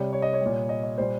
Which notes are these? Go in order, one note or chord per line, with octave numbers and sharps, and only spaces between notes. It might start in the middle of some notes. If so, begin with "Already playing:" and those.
Already playing: C3 G3 C#5
C#5
D#5
C#5
A#2 G3
D#5
D#5
A#2 G3 C5